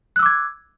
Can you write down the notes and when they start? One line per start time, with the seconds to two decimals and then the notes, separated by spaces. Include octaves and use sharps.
0.16 F#6
0.19 E6
0.23 D6
0.26 G#6